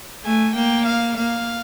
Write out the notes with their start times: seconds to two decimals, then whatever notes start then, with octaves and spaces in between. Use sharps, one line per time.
0.24 A3 G#5
0.55 A#3 G5
0.86 F5
1.16 A#3 F5